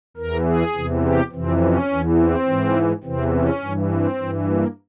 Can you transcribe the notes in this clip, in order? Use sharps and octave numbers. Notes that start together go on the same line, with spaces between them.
E2 E3 A#4
G#4
E2 C3 E3
G4
F2 C3 E3 C4
C#4
E2 E3
C4
G#2 E3
E2 C3 E3 C4
C#4
G2 E3
C4
G2 E3
A#3